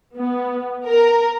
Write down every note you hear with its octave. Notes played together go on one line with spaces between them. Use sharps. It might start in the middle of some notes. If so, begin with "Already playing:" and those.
B3
A#4